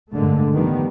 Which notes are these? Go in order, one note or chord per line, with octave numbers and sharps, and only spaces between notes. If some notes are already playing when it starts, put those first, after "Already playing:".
G2 A#2 D3 G#3 A3
D#3 F3 G3 B3